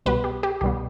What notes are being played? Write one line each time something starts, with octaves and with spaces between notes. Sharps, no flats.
C2 B2 G3 B3 B4
G4
G4
C2 B2 G3 B3 G4